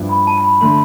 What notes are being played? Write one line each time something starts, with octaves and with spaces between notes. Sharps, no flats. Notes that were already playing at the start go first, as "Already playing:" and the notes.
Already playing: G2 F3 B3 E4
B5
A5
A5
B5
D3 A3 C6